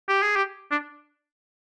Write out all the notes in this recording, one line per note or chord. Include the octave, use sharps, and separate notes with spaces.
G4
G#4
G4
D4